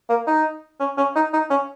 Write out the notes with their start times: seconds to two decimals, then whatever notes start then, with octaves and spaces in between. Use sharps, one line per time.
0.10 A#3
0.27 D#4
0.80 C#4
0.98 C#4
1.16 D#4
1.33 D#4
1.50 C#4